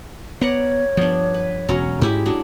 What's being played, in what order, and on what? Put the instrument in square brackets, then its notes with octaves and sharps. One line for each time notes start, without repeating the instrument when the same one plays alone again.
[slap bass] B3 [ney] C#5 [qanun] D5 F#5 A#5
[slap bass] G2 F3 [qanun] B3 D4
[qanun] B4
[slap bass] E1 [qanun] F#3 C#4 A#5
[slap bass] G#2 [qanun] G#3 E4 G4
[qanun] F#3 G#3 D4